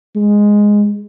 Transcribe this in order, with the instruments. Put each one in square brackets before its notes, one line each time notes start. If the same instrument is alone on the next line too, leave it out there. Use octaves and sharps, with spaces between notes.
[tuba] G#3